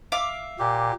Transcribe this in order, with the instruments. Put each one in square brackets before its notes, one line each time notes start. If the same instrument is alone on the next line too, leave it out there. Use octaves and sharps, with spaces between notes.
[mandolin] E5 F5 D6
[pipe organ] A#2 [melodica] G4